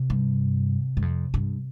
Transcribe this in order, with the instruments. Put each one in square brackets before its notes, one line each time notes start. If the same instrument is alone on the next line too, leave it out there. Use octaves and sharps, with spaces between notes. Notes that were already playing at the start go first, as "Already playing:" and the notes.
Already playing: [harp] C3
[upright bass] G2
G2
F2
G2